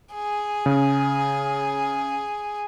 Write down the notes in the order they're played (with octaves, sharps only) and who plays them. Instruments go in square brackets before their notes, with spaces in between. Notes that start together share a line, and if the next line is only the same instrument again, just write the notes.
[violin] G#4
[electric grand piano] C#3